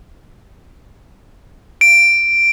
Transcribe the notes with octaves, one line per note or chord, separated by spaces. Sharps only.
D7